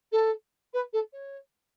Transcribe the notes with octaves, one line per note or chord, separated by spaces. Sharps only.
A4
B4
A4
C#5